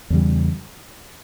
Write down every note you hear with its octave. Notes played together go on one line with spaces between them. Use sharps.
E2 C#3 G3